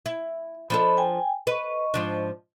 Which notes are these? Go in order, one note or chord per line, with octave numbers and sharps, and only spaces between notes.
E4
F3 D4 A4 D#5 B5
G5 G#5
B4 D#5 C#6
G#2 F3 D4